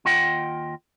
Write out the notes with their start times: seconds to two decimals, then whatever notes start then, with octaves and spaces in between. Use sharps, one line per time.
0.05 D#2 F4 D#5 F#5 G5